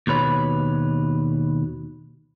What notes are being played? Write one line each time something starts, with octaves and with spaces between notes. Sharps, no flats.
D#2 B2 B4 C#5 B5